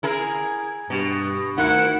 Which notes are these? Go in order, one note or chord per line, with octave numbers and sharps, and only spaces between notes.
E4 G#4 A#4
G2 B2
D2 D#3 E4 F#5